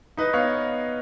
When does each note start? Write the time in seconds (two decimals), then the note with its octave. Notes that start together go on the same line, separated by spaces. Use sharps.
0.17 D#4 B4 D#5
0.33 B3 C#5 F5